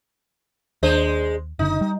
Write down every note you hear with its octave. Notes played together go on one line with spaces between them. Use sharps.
D#2 G#3 D4 C5
F#1 D3 D#4
G3